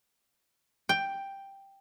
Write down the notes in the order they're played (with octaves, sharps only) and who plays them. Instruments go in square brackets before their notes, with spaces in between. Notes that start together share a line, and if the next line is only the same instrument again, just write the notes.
[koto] G5